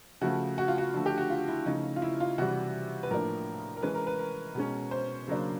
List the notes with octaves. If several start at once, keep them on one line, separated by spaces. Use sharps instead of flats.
C#3 F3 A3 C#4 F#4
F#4
F4
F#4
D3 F3 A3
G4
F#4
F4
E4
C#3 F3 A3 C#4 D#4
F4
E4
F4
C3 E3 G3 F#4
B4
A2 F3 A#3 D4 A#4
A#4
E3 G#3 C#4 B4
A#4
B4
A#4
B2 G#3 C#4
C5
C#3 F#3 A#3 D4